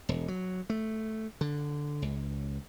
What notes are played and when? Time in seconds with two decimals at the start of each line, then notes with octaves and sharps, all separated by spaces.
0.09 E1
0.28 F#3
0.70 A3
1.41 D3
2.02 C#2